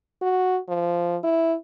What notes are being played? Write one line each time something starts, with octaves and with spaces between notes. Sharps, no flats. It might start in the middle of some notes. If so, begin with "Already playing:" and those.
F#4
F3
E4